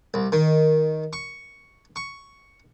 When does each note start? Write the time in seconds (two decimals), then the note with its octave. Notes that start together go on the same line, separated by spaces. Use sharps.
0.14 C2
0.32 D#3
1.13 C#6
1.96 C#6